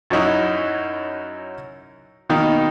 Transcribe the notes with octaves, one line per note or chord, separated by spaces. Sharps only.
F#2 F#3 C#4 D#4 E4 F#4
B2 D#3 A#3 D#4